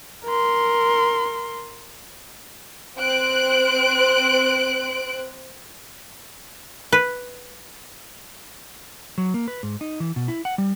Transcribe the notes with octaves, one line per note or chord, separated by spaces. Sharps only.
A#4 C6
C4 C5 F#6 D7
B4
F#3
A#3
B4
G#2
D#4
E3
B2
E4
F#5
G3